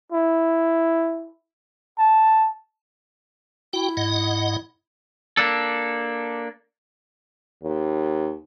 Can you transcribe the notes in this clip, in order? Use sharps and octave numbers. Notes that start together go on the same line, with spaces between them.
E4
A5
E4 F#4 G5
G#2 D#5 F#5
A#3 D4 A4
D#2